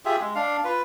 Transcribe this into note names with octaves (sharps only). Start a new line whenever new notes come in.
F4 G4 G#4 E5
G#3
D4 F5
F4 B4